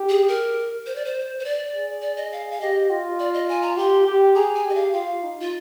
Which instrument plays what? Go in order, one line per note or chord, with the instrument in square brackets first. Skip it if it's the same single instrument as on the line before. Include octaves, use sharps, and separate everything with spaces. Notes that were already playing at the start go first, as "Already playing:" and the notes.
Already playing: [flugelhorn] G4
[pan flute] G#4
A#4
C5
D5
C5
C5
D5
[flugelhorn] G#4
[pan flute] D5
D#5
F5
F5
[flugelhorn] G4 [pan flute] D#5
[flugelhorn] F4
[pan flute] D5
D#5
G#5
A#5
[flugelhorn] G4 [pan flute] C6
[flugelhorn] G4
[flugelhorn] G#4 [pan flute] A#5
[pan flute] G#5
[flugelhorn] G4
[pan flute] D#5
F5
[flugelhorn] F4 [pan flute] F5
[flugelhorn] D#4
[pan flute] F4